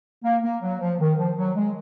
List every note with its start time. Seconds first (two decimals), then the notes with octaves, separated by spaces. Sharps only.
0.24 A#3
0.43 A#3
0.61 F#3
0.80 F3
0.99 D#3
1.18 F3
1.37 F#3
1.56 G#3